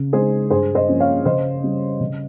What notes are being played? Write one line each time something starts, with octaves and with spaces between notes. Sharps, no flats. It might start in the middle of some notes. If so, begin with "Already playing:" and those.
Already playing: C#3
G#3 D#4 G#4 C5
G2 G#4 C5
C5 D#5
F3 A#3 C#4
C#5 F5
C#3 C5 D#5
G3 C#4
C#3